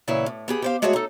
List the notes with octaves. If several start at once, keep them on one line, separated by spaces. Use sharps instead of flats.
A#2 C#3 E3 B3 E4 C#5
A2
B3 G4 G#4
G4 C5 F5
G#3 A3 F#4 G#4 C#5 F#5
D#4 A4